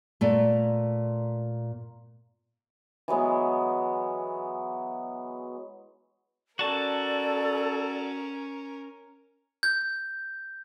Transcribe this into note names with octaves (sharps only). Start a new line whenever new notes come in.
A#2 A3
E3 F#3 G#3 B3
C#4 F#4 A4 A#4 D5 A5
G6